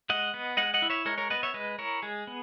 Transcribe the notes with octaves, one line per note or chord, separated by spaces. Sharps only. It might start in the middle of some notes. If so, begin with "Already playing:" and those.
G#3 D#5 F#5
B3
G#3 D#5 F#5
D#5 F#5
E4
C#5 E5
G#3 A#4 C#5
A#4 C#5
B3 B4 D#5
C#5 E5
G#3 B4 D#5
E4 A#4 C#5
G#3 G#4
B3